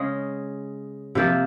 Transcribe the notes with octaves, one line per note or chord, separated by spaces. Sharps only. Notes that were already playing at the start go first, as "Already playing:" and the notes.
Already playing: C#3 G#3 C#4 G#4
C3 F3 A#3